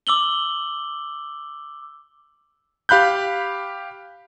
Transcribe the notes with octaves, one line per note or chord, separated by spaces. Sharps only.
D6 E6 F#7 G7
G4 F5 B5 F#6 G6